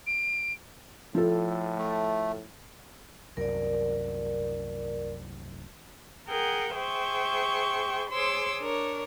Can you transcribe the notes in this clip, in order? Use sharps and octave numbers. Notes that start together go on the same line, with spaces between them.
D7
A2 F3 A4
A3
C2 F#2 A#4 D5
G#4 A#4 F#5 G5
G#4 C5 E5 G5 C#6
G#4 C5 C#5 C6 D6 E6
D4 A#4 C#5